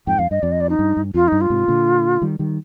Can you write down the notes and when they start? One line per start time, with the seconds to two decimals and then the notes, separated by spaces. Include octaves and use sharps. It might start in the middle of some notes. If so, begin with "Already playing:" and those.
0.07 F2 G#2 G5
0.19 F2 F5
0.31 G2 D#5
0.42 F2 D5
0.52 D#5
0.61 D5
0.70 D#4
0.79 G2
0.97 G2
1.14 F2 F4
1.28 G2 D#4
1.41 F4
1.50 G#2 C3
1.68 A#2 D3
2.22 D#3 G3
2.39 D#3 G3